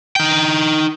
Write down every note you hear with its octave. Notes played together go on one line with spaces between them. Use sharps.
D#4 G5